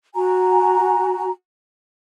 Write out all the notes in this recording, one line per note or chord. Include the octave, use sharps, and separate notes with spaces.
F#4 G#5 A#5